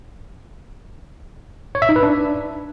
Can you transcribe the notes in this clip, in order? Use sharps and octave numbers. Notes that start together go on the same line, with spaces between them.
C#5
E5
D#4
B4
D4